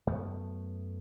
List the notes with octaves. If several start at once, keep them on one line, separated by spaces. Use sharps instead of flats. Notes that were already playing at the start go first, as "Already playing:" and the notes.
F#2 A3 B3